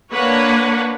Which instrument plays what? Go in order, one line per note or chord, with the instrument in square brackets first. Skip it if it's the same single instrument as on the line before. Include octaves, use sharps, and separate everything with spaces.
[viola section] A#3 D4 B4 C#5 F#5